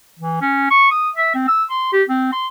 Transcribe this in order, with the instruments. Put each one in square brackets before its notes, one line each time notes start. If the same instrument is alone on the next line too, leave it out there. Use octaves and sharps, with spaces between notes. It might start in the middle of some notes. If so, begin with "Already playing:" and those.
[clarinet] E3
C#4
C#6
D#6
E5
C4
E6
C6
G4
C4
C6